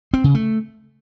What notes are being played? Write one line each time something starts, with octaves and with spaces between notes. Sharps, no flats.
C4
C#3
A3